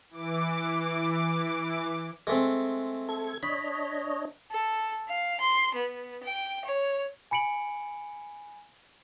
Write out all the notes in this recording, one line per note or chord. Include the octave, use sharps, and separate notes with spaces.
E3 D6
G#3 A3 C4
A4 G#6
D4 C#5 D#5 B5
A4
F5
C6
B3
G5
C#5
G#5 B5 C#7 D7 F#7